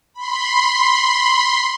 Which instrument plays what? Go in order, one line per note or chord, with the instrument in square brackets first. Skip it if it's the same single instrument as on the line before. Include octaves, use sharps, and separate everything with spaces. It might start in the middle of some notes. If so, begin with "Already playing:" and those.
[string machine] B5 C6